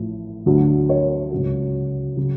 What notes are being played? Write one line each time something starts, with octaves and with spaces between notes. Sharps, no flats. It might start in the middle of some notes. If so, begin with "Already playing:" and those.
Already playing: A1 A2 F3
D2 D3 F#3
C#5
C#2 C#3 F#3
C#3 F#3